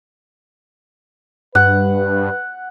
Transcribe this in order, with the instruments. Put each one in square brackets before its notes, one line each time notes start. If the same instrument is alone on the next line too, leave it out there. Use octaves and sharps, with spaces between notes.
[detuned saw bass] G2 [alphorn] B4 [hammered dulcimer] F#5